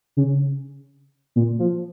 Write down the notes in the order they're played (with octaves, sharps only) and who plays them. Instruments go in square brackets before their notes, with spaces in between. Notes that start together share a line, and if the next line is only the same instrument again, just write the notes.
[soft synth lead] C#3
A#2
F3